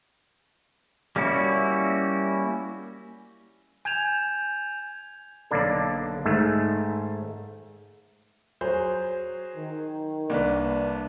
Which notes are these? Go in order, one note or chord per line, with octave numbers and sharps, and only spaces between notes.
G3 A#3 C#4 E4 F#4
G#5 G6 G#6 E7 F7
B1 D3 A#3 D4 A4
G#2 D#3 A3 E5
F#3 G#4 C5 G6
D#3
C2 A#3 D4 B4